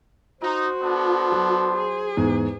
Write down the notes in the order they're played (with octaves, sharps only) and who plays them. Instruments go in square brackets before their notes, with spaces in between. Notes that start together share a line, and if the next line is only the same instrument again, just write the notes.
[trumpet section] D#4 [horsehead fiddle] F#4 [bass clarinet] C5
[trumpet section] B3 D4 A4
[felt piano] F#3
[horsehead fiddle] G#4
[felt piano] E2 G#2